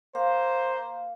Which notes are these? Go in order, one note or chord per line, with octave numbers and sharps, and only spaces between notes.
A#3 C5 F5